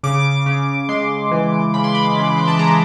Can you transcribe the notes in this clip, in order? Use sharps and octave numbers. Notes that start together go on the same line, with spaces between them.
C#3 D6
C#3
G#3 C6
E3
C#3 B5
C6
B5
C#3
A5
G#3 A#5